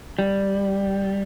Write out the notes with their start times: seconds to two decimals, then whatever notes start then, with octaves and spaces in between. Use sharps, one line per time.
0.19 G3